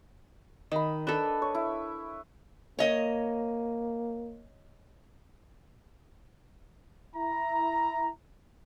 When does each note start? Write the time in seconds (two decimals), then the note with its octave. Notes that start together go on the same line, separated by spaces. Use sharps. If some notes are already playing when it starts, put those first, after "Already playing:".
0.72 D#3 D#5 B5
1.07 D4 A4 B4
1.42 C#5
1.55 E4
2.79 A#3 C#5 D#5
7.16 E4 A#5